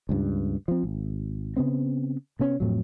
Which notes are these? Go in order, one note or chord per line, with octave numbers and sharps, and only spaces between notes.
C#2 G2
F3 C4
G#1
C#3 B3 C4
C3 B3 C#4
F2 A2 F#3